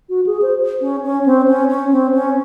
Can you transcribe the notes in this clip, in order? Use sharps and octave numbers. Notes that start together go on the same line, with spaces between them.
F#4
G#4
C5
C#4
C#4
C4
C#4
C#4
C4
C#4